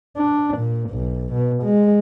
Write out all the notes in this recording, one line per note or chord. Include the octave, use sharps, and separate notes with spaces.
D4
A#2
B1
B2
G#3